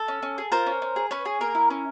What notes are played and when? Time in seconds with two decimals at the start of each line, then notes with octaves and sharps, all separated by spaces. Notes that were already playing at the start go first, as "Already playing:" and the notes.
Already playing: A4
0.08 C#4
0.22 C#4
0.38 G#4
0.52 F4 A#4 C5
0.66 C#4
0.82 C#4
0.96 G#4
1.11 C#4 B4 C#5
1.25 G#4
1.41 A#3 A#4
1.55 E4
1.70 C#4